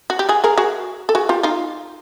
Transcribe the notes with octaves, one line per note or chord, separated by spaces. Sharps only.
F#4
G4
F#4 G#4
G#4 A#4
F#4 G#4
A4
F#4 G#4
F4 G4
D#4 F4